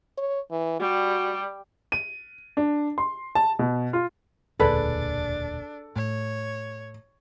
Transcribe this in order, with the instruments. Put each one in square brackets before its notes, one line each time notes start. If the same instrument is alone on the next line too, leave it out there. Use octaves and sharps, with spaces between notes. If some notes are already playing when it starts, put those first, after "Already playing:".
[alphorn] C#5
E3
[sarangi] G3 [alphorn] F#4
[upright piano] D#7
D4
C6
A5
B2
F4
[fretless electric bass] E1 D2 A#2 [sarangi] D4 [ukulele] G#4 B4 D5 [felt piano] A4
[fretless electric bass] A2 [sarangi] C#5